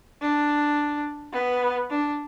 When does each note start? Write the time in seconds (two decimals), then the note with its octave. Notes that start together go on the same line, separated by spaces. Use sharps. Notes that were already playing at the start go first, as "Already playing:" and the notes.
0.21 D4
1.33 B3
1.90 D4